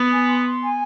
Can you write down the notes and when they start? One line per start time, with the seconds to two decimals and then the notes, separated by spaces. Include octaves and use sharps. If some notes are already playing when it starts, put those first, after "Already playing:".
Already playing: B3
0.11 G#5
0.27 C6
0.44 C6
0.62 G#5